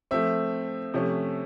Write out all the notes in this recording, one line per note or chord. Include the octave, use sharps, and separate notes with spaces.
F3 A3 C4 E5
C3 F3 A3 C#4